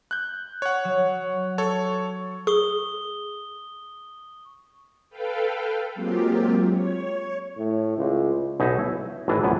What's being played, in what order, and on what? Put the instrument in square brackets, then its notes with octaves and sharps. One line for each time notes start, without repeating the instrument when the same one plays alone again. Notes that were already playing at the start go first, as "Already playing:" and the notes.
[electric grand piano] F#6 G6
C#5 F#5
[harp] F#3
[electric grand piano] A4 C#5
[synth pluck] G#4 [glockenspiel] C#6 D#6 G7
[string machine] A4 B4 F5 G5
F#3 G#3 A#3 C4 F4 G4
C#5
[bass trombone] A2
C#2
[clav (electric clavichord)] B1 B2 D#4 F#4 E5 G#5
E4
G#1 A2 E3 D4 D#5
A#1 F#2 A2 B3 G5 G#5